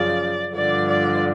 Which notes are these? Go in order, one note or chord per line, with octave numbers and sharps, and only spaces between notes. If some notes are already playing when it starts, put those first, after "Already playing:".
Already playing: F#2 C#3 F3 D5
G2 D3 F3 D5
D5